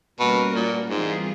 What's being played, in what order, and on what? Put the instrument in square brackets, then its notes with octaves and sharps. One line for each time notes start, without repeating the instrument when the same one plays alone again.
[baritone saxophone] B2 [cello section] G3 A#3 C#4 F#4 A#4
[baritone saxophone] A#2
[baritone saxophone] G#2 [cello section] E3 G3 C4 F4 G#4